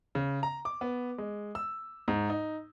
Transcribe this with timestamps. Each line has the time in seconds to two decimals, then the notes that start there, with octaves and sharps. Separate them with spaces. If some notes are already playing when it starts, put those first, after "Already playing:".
0.15 C#3
0.43 A#5
0.65 D6
0.81 B3
1.18 G#3
1.55 E6
2.08 G#2
2.30 D#4